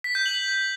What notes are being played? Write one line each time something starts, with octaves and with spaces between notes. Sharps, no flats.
B6
G6
F#7